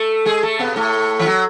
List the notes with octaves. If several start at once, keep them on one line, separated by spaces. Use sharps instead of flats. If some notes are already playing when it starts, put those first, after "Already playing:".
Already playing: A3 A4
G#3 G#4
A3 A4
B2 B3
A2 A3
E3
F#3